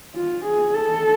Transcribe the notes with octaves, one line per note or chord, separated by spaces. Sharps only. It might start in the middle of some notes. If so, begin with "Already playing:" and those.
F4
G#4
A4